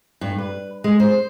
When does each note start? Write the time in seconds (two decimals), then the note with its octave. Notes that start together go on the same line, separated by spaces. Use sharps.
0.21 G2
0.38 B4
0.84 G#3
1.00 C5